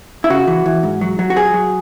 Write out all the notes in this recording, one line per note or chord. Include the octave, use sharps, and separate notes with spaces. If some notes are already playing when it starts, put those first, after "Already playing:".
E4
C#3 F#4
E3
E3
G#2
F#3
F#3
F#4
F#3 G#4
F#3